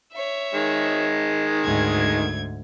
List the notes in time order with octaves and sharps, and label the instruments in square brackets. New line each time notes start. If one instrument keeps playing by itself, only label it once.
[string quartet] C#5 E5
[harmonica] D#3 G#3
[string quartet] D2 G#2 G#6